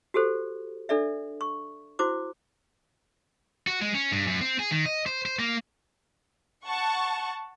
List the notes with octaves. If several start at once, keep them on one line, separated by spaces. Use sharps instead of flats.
F#4 G4 A4 C5
D4 A4 D5 E5
C#6
E4 F#4 C5 D6
F#4
G#3
C#4
G2
F#2
C4
G#4
D#3
D#5
C5
C5
A#3
F#5 A5 C#6